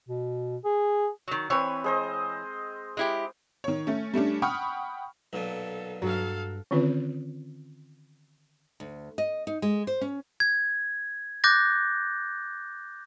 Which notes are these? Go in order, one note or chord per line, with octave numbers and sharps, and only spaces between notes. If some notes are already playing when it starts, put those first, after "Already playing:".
B2
G#4
D#3 F#3
E3 C4 B4 C#5
G#3 C5 D#5
G#3 E4 G4
D#3 C#5
A3 C#4
G3 A3 C#4 D4
F#5 G5 B5 C#6 D#6 F6
B1 A#2 A4
G2 F#3 A4 F5
D3 D#3 C4 C#4 F4 B4
D2
D#5
D#4
G#3
C5
C#4
G#6
D6 F#6 G6 A6 A#6